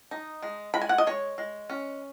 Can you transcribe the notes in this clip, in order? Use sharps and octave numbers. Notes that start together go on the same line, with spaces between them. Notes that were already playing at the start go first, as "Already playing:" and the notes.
D#4
G#3
G#3 B5
G#5
F#5
D#5
G#3 C#5
G#3
C#4